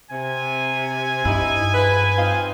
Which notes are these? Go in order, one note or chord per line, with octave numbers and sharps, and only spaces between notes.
C3 G#5
G2 D#4 E4
G#2 F3 B4
C4 D#4 F4